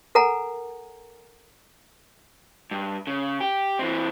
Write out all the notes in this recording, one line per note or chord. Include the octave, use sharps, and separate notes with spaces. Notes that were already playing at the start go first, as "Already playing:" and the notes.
A4 A#4 F#5 G#5 A#5
G2
C#3
G4
E3 C4